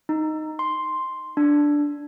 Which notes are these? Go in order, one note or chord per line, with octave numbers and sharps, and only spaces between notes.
D#4
C6
D4